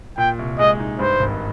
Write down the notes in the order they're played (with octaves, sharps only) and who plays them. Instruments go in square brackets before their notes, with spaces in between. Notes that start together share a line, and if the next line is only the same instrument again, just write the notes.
[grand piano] A#2 [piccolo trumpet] G5
[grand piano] C2
[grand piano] G#3 [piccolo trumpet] D#5
[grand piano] D#4
[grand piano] G2 [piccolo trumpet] C5
[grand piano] G#1